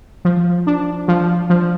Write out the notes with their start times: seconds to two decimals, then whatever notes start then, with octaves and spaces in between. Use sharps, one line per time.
0.25 F3
0.67 D4
1.08 F3
1.50 F3